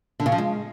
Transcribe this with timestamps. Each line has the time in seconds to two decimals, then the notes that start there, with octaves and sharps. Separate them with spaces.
0.20 D3
0.26 C#3
0.32 F3
0.38 G#3